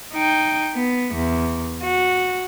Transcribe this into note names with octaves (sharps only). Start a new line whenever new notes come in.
D#4 G5
B3
E2
F#4